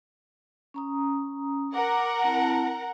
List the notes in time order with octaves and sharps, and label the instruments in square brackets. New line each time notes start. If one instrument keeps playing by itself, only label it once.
[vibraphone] C#4 A#5 D#6
[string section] A#4 F#5 A#5 [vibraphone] D6
[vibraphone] C4 E4 A5